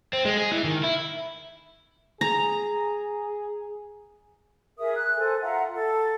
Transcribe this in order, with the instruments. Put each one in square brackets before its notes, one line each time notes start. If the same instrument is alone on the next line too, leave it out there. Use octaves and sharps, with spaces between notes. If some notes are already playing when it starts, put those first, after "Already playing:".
[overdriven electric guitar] C4
G#3
G#4
E3
D#3
E4
[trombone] G#4 [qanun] A#5
[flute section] G#4 A#4 E5 D#6
F#6
A4 C5 G#5
F4 E5 F#5 A#5
A4